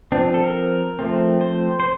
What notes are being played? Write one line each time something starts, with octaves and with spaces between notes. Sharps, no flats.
F3 C4 D4
A4
A#4
F3 A3 C4
C5
C5